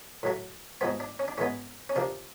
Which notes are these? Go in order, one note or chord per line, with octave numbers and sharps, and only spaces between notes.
A2 F#3 A3
G#2 F3 G#3 B3 C4
D4
C#4
D4
G#2 E3 G#3 B3 C#4
C#4
C3 F3 A#3 D4